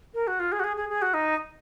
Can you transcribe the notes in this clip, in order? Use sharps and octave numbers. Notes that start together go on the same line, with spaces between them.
A#4
F#4
F4
G#4
F#4
G#4
G#4
G#4
F#4
D#4